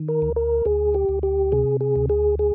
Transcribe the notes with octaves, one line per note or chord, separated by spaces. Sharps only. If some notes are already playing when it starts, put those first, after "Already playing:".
Already playing: D#3
A#4
D2
A#4
D2 G#4
G4
D2
G4
C3 G#4
G#4
D2
G#4
G#4